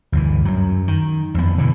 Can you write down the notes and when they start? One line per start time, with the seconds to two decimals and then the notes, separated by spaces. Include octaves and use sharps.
0.12 D2 G2 E3
0.45 F#2 F#3
0.88 D#3
1.34 F2 B3
1.58 B2 D3 E3